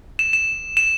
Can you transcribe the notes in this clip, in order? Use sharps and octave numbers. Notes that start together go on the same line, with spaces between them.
E7
E7
E7